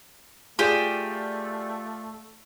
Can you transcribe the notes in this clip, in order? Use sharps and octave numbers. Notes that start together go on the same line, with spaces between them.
A3 F4 G4 G#4 D5 E7